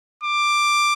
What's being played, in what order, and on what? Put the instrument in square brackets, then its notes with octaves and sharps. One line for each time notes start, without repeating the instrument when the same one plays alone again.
[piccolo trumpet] D6